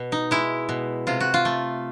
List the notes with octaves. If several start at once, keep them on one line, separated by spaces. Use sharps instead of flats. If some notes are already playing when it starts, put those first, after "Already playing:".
Already playing: B2
D#4
G#3 E4
B2
C3 F4
F#4
F4
A3